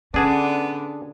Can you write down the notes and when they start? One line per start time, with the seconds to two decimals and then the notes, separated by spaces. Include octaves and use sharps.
0.14 D3 B3 C#4 D4 G#4 A5